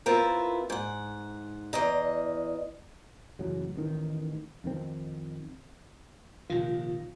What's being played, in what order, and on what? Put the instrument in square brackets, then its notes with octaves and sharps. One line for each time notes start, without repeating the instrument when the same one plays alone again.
[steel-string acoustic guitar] B3 C4 E4 F4 A#4
G#2 F#5
E2 D5 D#5 A#5
[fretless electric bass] A1 F#2 C#3 F#3
A1 D#3
F2 D#3 C4
[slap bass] A#1 C3 D#3 [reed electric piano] F4